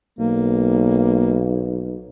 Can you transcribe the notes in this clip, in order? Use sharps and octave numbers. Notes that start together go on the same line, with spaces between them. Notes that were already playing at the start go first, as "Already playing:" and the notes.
B1 A#3